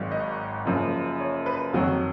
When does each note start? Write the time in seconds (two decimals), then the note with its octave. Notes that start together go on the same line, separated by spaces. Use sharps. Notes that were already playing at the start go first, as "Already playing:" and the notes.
Already playing: G#1 G#2 D#3 F#3
0.12 D#5
0.65 F#1 F#2 F3
1.20 C#5
1.46 B4
1.73 F2 D#3 F#3 F#4